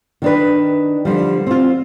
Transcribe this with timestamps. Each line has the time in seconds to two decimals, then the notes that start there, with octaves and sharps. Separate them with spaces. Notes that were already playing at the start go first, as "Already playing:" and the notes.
0.22 D#3 D4 B4
1.05 D3 F3 G3
1.47 C4 F4